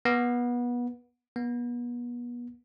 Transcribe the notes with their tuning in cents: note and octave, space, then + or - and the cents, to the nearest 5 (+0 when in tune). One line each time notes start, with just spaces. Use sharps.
B3 -25
B3 -35